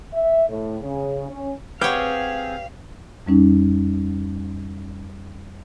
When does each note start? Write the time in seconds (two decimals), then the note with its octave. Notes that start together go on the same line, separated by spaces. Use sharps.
0.13 E5
0.49 A2
0.81 C#3
1.29 C#4
1.81 C4 G4 G#4 B4 C#5 F5 F#5 F6
3.26 F2 G3 C#4 D#4